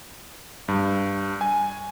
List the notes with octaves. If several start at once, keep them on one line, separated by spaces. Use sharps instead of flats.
G2
G#5